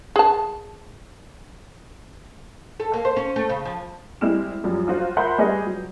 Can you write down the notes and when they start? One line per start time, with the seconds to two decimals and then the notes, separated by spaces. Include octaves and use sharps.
0.16 G#4 A5
2.80 A4
2.94 A#3
3.05 C5
3.16 C#4
3.36 A3
3.49 C#3
3.65 F3
4.21 G3 G#3 C4 E4 F6 E7
4.64 F#2 F3 G3
4.87 F#3 F4 F#4 C5
5.17 A#4 E5 F#5 B5 C6 G6
5.38 G3 G#3 G#4 B4 D#5
5.66 F#3